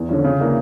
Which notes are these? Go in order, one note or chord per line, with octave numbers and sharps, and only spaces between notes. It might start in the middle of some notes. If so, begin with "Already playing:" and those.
Already playing: E2
D3 F3 C#4
C#3
E3 A#3 D4